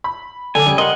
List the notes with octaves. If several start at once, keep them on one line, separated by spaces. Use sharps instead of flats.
B5
D3 A4 D5 G#5
C#3 G3
A#4 D#5 F#5 C6